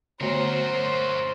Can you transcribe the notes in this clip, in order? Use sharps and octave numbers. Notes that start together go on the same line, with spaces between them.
D3 A3 F#4 A#4 C5 C#5